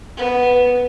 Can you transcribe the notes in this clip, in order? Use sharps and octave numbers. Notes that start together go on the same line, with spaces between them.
B3